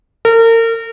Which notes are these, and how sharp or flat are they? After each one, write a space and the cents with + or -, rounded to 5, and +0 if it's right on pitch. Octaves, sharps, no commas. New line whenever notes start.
A#4 -35